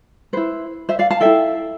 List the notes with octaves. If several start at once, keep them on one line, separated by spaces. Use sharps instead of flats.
E4 B4 C5
C5 E5
D5 F5
F5 A5
E4 A4 E5 G5